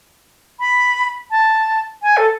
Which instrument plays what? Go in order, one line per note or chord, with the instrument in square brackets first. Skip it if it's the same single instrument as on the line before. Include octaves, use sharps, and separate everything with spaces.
[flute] B5
A5
G#5
A4